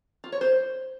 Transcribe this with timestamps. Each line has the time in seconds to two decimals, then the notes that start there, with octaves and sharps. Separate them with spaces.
0.24 F4
0.32 C#5
0.41 C5